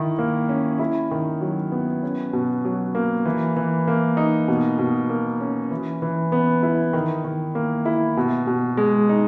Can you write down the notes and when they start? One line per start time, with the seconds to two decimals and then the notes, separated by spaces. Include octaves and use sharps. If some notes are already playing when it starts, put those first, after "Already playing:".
Already playing: D#3 E4
0.19 A#3
0.49 C#4
0.79 E4
1.11 D#3
1.41 F#3
1.72 B3
2.03 C#4
2.33 B2
2.65 F#3
2.95 A#3
3.25 E3
3.56 E3
3.88 A#3
4.17 D#4
4.48 B2
4.79 B2
5.10 A#3
5.41 C#4
5.71 E3
6.02 E3
6.32 B3
6.63 E4
6.93 D#3
7.24 D#3
7.55 A#3
7.85 E4
8.17 B2
8.47 B2
8.77 G#3
9.09 D#4